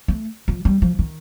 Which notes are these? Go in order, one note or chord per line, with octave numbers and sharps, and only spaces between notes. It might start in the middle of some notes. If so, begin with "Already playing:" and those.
A3
F3
G3
F3
D#3